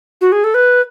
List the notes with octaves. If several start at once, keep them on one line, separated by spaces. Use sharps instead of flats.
F#4
G#4
A4
B4